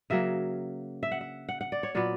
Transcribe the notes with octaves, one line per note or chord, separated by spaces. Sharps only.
C#3 F#3 A#3 E5
E5
F#5
E5
F#5
F#5
D5
C#5
A#2 F#3 B3 D5